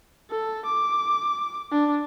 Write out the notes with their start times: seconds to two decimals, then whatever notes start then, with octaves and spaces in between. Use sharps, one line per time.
0.30 A4
0.66 D6
1.72 D4